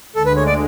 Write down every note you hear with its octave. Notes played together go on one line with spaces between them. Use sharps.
D2 D3 G#3 A4
B4
C#5
D5